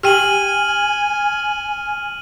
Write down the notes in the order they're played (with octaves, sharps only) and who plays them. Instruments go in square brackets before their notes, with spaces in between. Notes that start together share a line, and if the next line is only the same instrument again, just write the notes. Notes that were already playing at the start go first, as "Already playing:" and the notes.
[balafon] G4 G5 [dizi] G#5 [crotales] F6 D#7 F#7